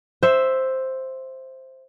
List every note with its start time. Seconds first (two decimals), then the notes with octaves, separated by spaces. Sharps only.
0.23 C5 E5